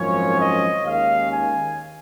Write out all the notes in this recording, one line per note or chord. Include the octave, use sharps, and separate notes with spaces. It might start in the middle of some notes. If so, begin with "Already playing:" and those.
Already playing: G#1 F#2 F3 G#3 C#4 C#5
D#5
D#2 D#3 G#3 C#4 F5
G#5